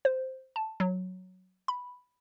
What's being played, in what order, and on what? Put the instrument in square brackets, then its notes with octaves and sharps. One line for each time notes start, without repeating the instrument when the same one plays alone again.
[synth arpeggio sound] C5
A5
F#3
B5